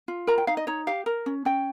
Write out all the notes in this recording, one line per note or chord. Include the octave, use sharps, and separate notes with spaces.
F4
A#4 A#5
G5
D#4 F5
D#5
D#4 C#5
G4 F5
A#4
C#4
C#4 G5